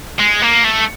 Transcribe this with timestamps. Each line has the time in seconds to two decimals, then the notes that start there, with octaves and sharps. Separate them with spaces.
0.19 G#3
0.42 A#3
0.65 A3